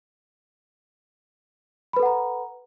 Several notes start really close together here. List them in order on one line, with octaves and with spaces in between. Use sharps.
B5 B4 A4 F#5 A#5